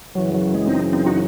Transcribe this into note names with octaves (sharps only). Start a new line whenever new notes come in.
F#2 C#3 E3 F#3
F#3
G#3
C4 D#4
C4 D#4
D#4 F#4